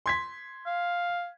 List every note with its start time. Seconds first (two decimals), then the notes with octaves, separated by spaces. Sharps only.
0.06 C6 G#6 B6
0.66 F5